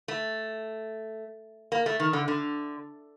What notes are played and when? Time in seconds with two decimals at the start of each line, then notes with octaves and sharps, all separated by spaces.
0.08 A3
1.72 A#3
1.86 A3
2.00 D#3
2.13 D3
2.28 D3